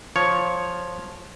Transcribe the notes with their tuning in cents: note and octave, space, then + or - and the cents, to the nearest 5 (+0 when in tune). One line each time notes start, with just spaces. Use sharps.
F3 +5 C#5 +0